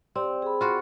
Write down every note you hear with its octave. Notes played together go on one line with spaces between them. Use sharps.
C4 G4 D5
G#4 B5
F4 F#4